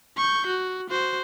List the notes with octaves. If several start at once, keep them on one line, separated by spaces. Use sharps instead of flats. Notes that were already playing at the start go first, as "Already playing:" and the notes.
C#6 G6
F#4
F#4 C5